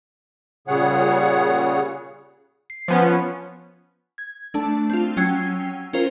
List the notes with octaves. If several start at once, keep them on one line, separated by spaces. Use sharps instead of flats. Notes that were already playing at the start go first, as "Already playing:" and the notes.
A#2 C#3 G3 G#4 C#5 F#5
C7
F3 B3 C#4
G#6
A3 D4 A5
C4 F4
F#3 C#4 G5 E6 G#6 C7
C#4 F4 A#4 C5